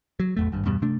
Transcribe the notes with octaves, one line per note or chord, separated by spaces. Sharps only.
F#3
A1 E2 A3
G#1 G2
E2 G2 B2 G3
C3 A3 D4